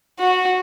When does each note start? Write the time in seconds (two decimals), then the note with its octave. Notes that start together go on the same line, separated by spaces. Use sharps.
0.19 F#4